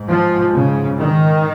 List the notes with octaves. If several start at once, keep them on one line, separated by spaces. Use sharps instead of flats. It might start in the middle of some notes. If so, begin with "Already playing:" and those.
Already playing: G#2
F3
C#3
D#3